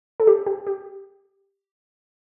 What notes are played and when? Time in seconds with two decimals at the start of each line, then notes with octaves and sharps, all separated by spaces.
0.20 A4
0.27 G4
0.46 G4
0.67 G4